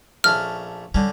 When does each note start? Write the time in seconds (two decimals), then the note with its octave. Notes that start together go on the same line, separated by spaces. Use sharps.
0.24 A#1 A3 C#4 F6
0.95 D3 G3 C#4